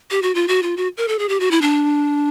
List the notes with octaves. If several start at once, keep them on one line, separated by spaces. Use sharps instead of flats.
G4
F#4
F4
F#4
F4
F#4
A#4
A4
G#4
G4
F#4
E4
D4